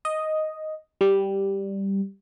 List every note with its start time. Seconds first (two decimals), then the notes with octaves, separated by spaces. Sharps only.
0.05 D#5
1.01 G3